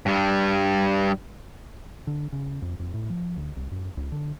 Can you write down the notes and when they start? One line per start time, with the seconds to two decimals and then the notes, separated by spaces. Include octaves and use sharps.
0.06 G2 G3
2.07 D3
2.32 C#3
2.62 F2
2.79 F2
2.94 A2
3.10 F3
3.37 D2
3.56 C2
3.71 F#2
3.97 C#2
4.12 D3